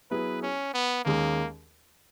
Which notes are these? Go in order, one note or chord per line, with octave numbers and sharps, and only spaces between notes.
F#3 B3 E4 G#4 B4
C#4
B3
D#2 D#3 G#3 A#3 C#4 G#4